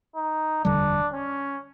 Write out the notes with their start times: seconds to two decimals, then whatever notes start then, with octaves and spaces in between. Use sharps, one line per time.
0.16 D#4
0.64 F1 D#2 D3 G3 D4
1.13 C#4